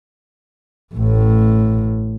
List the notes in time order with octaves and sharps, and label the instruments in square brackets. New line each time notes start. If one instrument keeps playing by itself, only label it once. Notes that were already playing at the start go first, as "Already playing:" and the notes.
[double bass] A1 A2